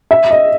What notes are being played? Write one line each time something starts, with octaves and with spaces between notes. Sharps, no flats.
E5
D#5